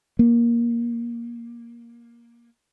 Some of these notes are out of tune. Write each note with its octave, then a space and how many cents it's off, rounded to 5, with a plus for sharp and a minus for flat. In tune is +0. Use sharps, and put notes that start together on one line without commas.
A#3 +15